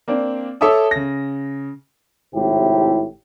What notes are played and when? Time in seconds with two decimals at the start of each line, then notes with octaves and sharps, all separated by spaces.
0.08 A#3 C4 D4
0.61 A4 C#5 E5 A5 D6 D#6
0.91 C#3 A#6
2.34 G#1 A2 C3 E4 G4